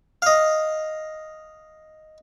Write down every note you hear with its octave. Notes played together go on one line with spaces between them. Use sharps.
D#5 F5